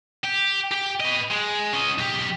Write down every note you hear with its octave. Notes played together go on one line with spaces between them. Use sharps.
G4
G4 G5
B4 D#5
G#3
C#4 D#5
B1 G4